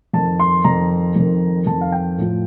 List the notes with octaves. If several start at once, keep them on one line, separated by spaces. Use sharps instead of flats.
F2 D#3 A5
C6
F2 D#3 A#5
F2 D#3
F2 D#3 A5
F5
G5
A2 F3